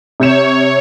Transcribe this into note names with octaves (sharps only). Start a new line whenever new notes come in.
C3 C#5 G6 E7